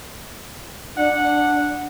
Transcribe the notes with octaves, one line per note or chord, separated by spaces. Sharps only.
D4 F#5